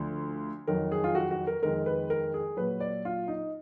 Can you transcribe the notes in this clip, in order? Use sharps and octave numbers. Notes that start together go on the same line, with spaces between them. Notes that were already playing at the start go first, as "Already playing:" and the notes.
Already playing: D2 D3 F3
F2 D#3 F#3 A#4
G#4
F4
F#4
F#4
A#4
F2 D#3 G#3 A#4
B4
A#4
G#4
A#2 F#3 B4
D5
F4
D#4